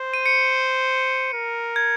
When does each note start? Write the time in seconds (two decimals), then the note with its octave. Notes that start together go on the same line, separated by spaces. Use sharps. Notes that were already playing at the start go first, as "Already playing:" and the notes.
Already playing: C5
0.14 D#7
0.26 C#7
1.33 A#4
1.76 G#6